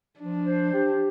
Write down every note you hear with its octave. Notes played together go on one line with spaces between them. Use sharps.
F3 D4
C5
G4